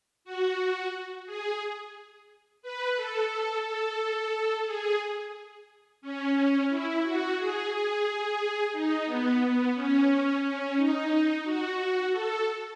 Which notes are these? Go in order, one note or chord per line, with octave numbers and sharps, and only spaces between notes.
F#4
G#4
B4
A4
A4
G#4
C#4
E4
F#4
G#4
G#4
D#4
B3
B3
C#4
C#4
D#4
F#4
A4